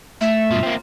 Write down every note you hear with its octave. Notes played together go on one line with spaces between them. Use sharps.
A3 E5
G2 B2 F4
A#3 C4